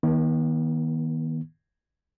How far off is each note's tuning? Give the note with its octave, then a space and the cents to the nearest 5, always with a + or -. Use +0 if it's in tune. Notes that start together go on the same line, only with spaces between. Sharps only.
D#3 +20 B3 -45